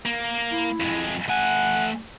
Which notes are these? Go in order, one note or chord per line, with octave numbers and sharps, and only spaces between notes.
A#3
E4
F2 G#3
A3 F#5 G#5